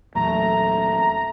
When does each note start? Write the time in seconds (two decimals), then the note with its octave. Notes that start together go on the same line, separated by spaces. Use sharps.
0.15 E2 A#2 F#3 A3 A#5